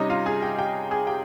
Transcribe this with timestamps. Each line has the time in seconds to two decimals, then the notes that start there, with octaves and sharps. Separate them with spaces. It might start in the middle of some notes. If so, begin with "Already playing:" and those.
Already playing: C3 G3 C#4 D#4 D#5
0.10 F4 F5
0.26 G#4 G#5
0.42 G4 G5
0.58 G4 G5
0.91 G#4 G#5
1.07 G4 G5